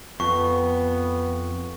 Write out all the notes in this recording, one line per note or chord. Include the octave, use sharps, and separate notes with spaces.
F2 B3 C#6